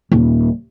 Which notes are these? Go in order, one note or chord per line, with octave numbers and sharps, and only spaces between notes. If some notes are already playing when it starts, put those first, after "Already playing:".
D#1